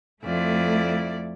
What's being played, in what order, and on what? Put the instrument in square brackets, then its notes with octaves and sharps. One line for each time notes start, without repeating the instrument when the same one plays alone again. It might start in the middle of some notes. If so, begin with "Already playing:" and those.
[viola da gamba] F2 E4 D5 [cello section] A3